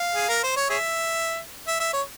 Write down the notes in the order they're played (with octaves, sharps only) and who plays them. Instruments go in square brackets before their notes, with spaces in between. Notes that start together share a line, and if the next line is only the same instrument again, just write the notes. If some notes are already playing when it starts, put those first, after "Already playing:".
Already playing: [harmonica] F5
G#4
A#4
C5
C#5
G#4 C#5 E5
E5
E5
C#5